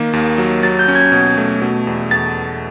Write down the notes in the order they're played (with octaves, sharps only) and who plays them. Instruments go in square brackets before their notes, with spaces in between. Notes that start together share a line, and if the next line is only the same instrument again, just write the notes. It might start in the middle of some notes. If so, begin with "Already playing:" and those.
Already playing: [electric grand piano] D#3 A#3
D#2
F#3
[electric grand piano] F#3 [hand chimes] A6
[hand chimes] G6
[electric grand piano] C#4
[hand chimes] G#6
[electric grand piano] B2
A3
B2
E2
[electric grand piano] E2 [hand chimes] A6